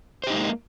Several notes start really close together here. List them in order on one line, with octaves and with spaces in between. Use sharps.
C5 G4 D#4 G#3 A#3